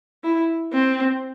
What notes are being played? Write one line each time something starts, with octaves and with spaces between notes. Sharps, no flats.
E4
C4